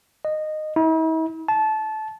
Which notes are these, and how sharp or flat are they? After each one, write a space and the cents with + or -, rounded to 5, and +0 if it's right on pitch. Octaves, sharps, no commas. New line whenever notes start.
D#5 -15
E4 -45
A5 -20